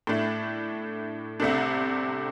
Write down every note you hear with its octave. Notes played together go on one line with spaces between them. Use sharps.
A2 A3 D4
C2 C3 A3 D4